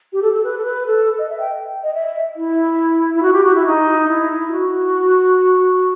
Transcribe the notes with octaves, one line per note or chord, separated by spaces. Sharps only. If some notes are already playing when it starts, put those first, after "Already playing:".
G4
A4
A4
B4
A4
B4
A4
D#5
E5
G5
D#5
E5
E4
E4
F#4
G4
F#4
E4
D#4
E4
F#4